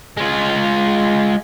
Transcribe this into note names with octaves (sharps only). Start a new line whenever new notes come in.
G#3 F4